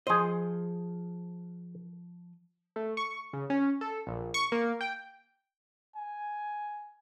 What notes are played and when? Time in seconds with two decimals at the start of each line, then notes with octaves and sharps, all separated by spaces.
0.07 F3 G#4 C5 D#5
2.76 A3
2.97 C#6
3.33 C#3
3.50 C#4
3.81 A4
4.07 A#1
4.34 C#6
4.52 A#3
4.81 G5
5.96 G#5